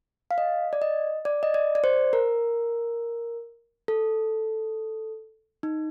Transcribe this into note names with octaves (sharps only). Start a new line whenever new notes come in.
F5
D#5
D5
D#5
D5
D#5
D5
D5
C5
A#4
A4
D#4